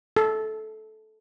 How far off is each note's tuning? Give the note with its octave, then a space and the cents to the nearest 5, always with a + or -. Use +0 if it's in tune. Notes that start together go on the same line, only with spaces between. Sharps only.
A4 -15